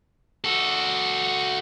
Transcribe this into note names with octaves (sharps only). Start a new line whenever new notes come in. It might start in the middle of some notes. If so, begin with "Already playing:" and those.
F#4 A4